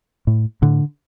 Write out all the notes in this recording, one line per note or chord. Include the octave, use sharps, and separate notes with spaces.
A2
A2 D3